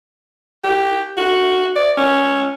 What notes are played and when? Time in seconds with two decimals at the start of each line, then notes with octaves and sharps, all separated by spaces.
0.63 G4
1.17 F#4
1.76 D5
1.97 C#4